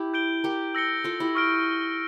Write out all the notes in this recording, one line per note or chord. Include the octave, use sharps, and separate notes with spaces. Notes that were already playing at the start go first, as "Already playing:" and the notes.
Already playing: E4 G4
G6 D7 G7
G4 A#4
E6 A#6 C#7 G7
F4 A4
E4 G4
C#6 F6 A#6 D7